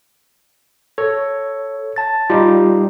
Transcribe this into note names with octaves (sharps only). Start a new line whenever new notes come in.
A4 C#5
A5 A6
G3 D#4 F4 G4